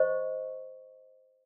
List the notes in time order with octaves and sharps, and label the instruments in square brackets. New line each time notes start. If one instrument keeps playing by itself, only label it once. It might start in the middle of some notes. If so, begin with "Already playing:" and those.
Already playing: [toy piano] C5 D#5 C#6